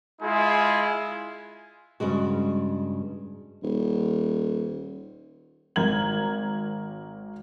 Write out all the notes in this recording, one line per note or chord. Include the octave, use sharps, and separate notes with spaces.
G#3 E4 F4 G#4
G2 C#3 G#3 F#4
D#1
G#1 A#4 G#6 F#7